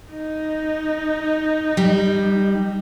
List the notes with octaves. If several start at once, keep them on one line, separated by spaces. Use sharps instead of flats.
D#4
G3